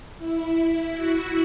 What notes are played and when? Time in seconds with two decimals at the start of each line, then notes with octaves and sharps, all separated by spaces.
0.18 E4
0.92 F#4